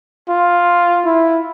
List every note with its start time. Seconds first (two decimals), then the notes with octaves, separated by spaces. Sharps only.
0.29 F4
1.05 E4